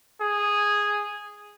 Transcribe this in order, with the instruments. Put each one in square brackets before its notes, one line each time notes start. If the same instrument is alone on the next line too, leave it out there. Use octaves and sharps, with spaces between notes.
[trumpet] G#4